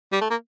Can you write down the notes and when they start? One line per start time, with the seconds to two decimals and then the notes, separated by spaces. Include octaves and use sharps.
0.12 G3
0.21 A3
0.30 A#3